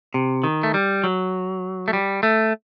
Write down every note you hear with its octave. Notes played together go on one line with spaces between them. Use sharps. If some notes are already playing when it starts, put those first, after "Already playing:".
C3
D#3
A3
G3
F#3
A3
G3
A3